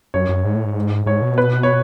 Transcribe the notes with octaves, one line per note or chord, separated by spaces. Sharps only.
F#2 C#5
F#2
G#2
A2
G#2
G#2 C#5
B2
B4
C#5